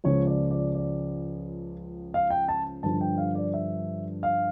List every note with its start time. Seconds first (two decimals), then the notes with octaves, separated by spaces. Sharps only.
0.04 C#2 C#3 F3 C#5
0.27 D5
0.51 D5
0.75 D5
2.14 F5
2.30 G5
2.49 A5
2.83 G2 D3 F3 A5
3.01 G5
3.18 F5
3.35 D5
3.54 E5
4.23 F5